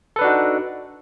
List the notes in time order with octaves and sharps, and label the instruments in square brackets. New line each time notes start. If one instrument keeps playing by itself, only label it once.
[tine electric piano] A4
B4
D4
F#4
D#4